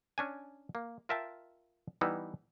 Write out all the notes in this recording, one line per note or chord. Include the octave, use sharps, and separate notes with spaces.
C#4 D4 G#5
A#3
F4 A#4 E5 G5 A5
E3 G3 B3 D#4 E4